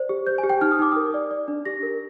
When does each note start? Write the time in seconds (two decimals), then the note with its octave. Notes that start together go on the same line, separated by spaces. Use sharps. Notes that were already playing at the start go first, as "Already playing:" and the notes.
Already playing: C5 D5
0.09 G4
0.27 C5 G6
0.38 G#5
0.44 G4
0.50 G5
0.61 D#4 F6
0.72 D#6
0.79 D#4 D6
0.92 A#4 D#6
1.14 D5
1.31 D5
1.48 D4
1.65 G4 A#6
1.83 A#4